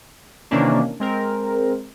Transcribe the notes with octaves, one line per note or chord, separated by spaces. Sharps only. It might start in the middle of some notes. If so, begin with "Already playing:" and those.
C3 D#3 E3 A#3 C#4 D4
G#3 C4 A#4